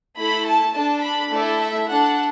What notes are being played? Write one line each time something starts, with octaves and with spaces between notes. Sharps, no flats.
A3 E4 A4 B5
A5
D4 A4 A5
B5
A3 E4 A4 D5
E5
D4 A4 F#5